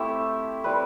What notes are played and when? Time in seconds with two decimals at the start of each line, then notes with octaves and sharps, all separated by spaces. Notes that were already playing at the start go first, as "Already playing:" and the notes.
Already playing: A3 C4 E4 G4
0.64 G3 C4 E4 B4